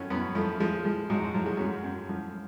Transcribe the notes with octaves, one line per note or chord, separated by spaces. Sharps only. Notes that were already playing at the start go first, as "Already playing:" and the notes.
Already playing: F#2 C#4
F#2 B3
F3 A3
F3 G#3
F3 G#3
G#2 F#3
F3 F#3
G#3
F#2 F#3
F#2
F3